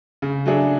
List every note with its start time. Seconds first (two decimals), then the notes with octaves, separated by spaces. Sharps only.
0.22 C#3
0.46 F#3 A3 D4 G#4